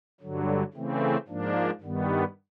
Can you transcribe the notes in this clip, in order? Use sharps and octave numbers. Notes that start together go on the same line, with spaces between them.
G2 D3 F#3
C#3 E3 A3 C4
G#2 F3 A#3 D4
G2 D#3 G3 B3